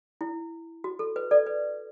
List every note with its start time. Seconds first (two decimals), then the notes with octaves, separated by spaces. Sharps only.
0.21 E4
0.84 F#4
0.99 A4
1.16 B4
1.31 A4 D5
1.46 B4